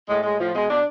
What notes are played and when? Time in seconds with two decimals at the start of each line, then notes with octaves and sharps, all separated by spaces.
0.08 A2 G#3
0.24 A2 G#3
0.39 A2 F3
0.54 B2 G#3
0.69 B2 D4